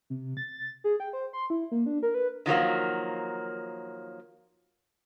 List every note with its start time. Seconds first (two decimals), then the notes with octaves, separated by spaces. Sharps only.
0.10 C3
0.37 A6
0.84 G#4
1.00 G5
1.13 C5
1.33 C6
1.50 E4
1.71 A#3
1.86 D4
2.03 A#4
2.14 B4
2.46 D#3 F3 F#3 A#3